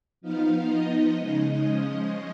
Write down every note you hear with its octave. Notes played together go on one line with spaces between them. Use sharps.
F3 B3 D#4 F5
F3 B3 D#4 D#5
C#3 G#3 D#4 D#5
F3 G#3 C#4